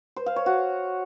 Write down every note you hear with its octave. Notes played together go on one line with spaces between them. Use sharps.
C5
F5
C#5
F#4